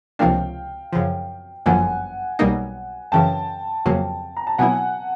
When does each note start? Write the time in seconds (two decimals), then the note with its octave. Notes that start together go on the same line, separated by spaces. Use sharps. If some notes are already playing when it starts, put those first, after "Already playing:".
0.19 C#2 C3 F3 A#3 D4 F5 G5
0.93 F#2 C#3 F3
1.66 G1 F#2 D3 F3 A#3 F#5 G#5
2.39 B1 B2 G3 A#3 D#4
3.12 F#2 C#3 E3 G5 A5
3.86 F2 C#3 F#3 A#3
4.37 A#5
4.47 A5
4.58 B2 F#3 B3 E4 F#5 G#5